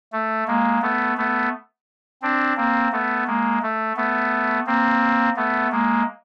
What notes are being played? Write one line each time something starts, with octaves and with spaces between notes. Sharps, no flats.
A3
G#3 A#3
A3 B3
A3 B3
C4 D4
A#3 C4
A3 B3
G#3 A#3
A3
A3 B3
A#3 C4
A3 B3
G#3 A#3